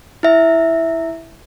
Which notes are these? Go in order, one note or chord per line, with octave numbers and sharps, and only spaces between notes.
E4 E5